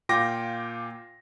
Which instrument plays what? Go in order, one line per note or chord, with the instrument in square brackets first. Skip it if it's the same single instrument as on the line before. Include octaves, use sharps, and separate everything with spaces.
[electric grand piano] A#2 F4 G5 D6 A#6